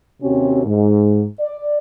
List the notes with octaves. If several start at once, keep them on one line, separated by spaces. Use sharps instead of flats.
D#2 C3 C4 C#4 F#4
G#2
D5